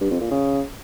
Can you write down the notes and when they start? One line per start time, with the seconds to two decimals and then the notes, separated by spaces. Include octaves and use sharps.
0.01 G2
0.11 F2
0.21 A#2
0.31 C#3